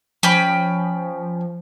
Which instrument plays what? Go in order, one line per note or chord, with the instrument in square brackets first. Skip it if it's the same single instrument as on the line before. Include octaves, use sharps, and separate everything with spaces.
[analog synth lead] F3 [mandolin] C#4 G5 B5